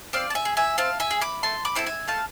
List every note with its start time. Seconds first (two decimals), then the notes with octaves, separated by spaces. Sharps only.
0.13 C4 D5 F5
0.30 A5
0.35 E5 G#5
0.45 G#4
0.57 E5 G#5
0.78 C4 F5 A5
1.00 E5 G#5
1.11 G#4
1.21 B5 D6
1.43 A3 A5 C6
1.65 B5 D6
1.75 C4 E4 A4 A5
1.86 E5 G#5
2.08 A3 F5 A5